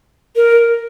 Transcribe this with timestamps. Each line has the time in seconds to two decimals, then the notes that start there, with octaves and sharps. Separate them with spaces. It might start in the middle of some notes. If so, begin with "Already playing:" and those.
0.36 A#4